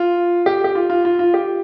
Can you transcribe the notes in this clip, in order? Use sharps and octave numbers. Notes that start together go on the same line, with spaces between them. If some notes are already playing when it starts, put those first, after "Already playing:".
Already playing: F4
G4
G4
F4
F4
F4
F4
G4